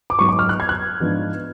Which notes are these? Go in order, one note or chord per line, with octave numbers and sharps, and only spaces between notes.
D6
G#2 F#3 B3 C#6
D6
F6
F#6
G#6
F#6
G#2 F3 B3 D4